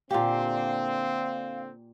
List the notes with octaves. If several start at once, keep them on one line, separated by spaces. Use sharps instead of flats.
A#2 D3 C4 G4 F5